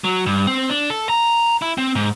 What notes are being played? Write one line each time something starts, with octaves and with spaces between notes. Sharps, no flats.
F#3
G2
C4
D4
A4
A#5
E4
C4
G#2